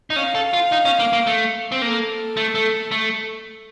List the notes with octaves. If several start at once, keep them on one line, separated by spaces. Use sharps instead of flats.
D#4
C#4 F5
A4
F4
D#4
C#4
A#3
A#3
A3
C4
A#3 A4
A3
A3
A3